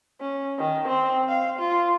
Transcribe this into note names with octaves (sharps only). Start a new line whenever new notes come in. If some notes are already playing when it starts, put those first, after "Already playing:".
C#4
D#3
C4
F5
F4